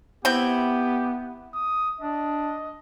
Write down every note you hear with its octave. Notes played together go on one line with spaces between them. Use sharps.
B3 C4 E4 G4 G5
D#6
D4 D#5